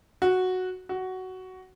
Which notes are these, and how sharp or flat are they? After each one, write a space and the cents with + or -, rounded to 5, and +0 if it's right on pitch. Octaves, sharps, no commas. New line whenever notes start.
F#4 -5
F#4 +10